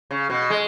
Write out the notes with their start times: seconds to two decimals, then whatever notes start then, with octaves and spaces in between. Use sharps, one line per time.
0.11 C#3
0.30 B2
0.50 G#3